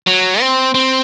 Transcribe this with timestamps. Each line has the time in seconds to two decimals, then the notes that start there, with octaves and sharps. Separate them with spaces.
0.07 F#3
0.41 C4
0.74 C4